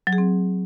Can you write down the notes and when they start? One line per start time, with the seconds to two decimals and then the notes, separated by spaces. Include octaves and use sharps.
0.07 F#3
0.13 G#4
0.18 C4